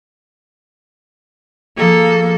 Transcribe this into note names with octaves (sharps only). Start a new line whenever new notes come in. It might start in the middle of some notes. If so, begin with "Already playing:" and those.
F3 A#3 G#4 A4